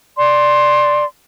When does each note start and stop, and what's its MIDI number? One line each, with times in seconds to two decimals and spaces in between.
0.17 1.03 74
0.17 1.03 84